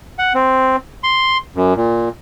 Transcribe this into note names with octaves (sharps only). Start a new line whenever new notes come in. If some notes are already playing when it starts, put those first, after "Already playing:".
F#5
C4
C6
F#2
A#2